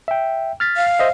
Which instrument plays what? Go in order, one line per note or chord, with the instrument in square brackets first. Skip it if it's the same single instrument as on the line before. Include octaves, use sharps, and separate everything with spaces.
[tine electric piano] E5 G5
F6 A6 B6
[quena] F5
[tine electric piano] C5 D#5 E5